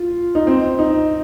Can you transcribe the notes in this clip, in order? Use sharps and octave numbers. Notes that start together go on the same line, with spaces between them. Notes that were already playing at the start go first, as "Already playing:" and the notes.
Already playing: F4
D#4
C4
D#4